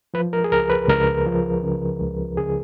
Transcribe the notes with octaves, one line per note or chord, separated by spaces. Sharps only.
F3 B4
A#4
G#4
C#2 A#4
B4
C#2 A#4
F3
C#3
C#2
C#3 G#4